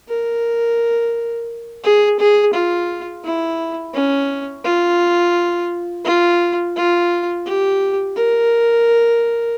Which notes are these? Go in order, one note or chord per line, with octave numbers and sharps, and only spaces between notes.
A#4
G#4
G#4
F4
E4
C#4
F4
F4
F4
G4
A#4